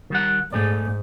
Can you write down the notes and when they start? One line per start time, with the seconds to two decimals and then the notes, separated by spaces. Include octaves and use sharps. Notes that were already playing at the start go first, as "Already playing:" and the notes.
0.10 D#3 G3 F#5
0.53 G#2 A3 G#4 D5